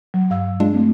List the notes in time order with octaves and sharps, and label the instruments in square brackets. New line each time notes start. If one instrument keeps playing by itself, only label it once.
[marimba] F#3
G2 F5 E6
[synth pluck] G#3 D4 F4
[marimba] A3 C4